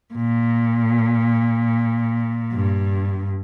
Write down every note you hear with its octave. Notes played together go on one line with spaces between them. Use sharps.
A#2
G2